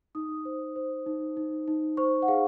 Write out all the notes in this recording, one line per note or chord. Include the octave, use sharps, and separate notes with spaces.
D#4 D#6
C5
C5
D#4
D#4
D#4
C5 C#6
F#5
G#4 F5